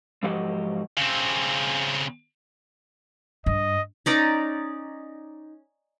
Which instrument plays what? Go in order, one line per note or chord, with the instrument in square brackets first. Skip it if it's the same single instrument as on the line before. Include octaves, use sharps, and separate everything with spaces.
[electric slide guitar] G#2 F3 F#3 G4 D#5 F#5
[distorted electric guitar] C#3 C4
[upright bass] G2 [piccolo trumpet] D#5
[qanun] C#4 D#4 D5 A#5